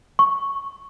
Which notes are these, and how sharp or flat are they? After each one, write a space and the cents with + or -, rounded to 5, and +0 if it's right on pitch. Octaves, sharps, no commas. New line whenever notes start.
C#6 -5